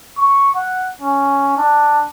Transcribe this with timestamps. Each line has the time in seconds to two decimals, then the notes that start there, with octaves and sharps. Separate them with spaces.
0.17 C#6
0.55 F#5
1.01 C#4
1.58 D4